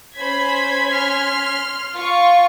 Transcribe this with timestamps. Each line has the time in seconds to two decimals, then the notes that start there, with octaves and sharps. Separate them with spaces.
0.17 C#4 C5 B5 G#6 B6
0.89 C6 F6
1.95 F4 C#6